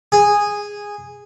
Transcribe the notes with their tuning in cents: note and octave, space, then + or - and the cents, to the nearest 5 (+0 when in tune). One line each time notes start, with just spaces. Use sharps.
G#4 -10